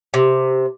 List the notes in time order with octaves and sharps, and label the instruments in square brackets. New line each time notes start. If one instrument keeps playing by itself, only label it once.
[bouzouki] C3